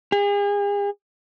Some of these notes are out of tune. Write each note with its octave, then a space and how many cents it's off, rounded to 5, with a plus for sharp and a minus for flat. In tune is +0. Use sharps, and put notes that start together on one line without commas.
G#4 -40